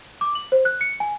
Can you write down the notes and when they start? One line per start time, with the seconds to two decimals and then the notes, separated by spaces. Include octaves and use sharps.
0.21 D6
0.35 F#7
0.52 C5
0.65 F#6
0.81 C#7
1.00 G#5